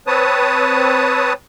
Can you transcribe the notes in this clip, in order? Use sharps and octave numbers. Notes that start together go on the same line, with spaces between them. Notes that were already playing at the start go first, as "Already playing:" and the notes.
C4 B4 C#5 A5 D#6